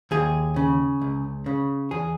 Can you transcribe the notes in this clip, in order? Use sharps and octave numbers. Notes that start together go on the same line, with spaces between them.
D#2 G#4
C#3
C#2
C#3
E2 G#4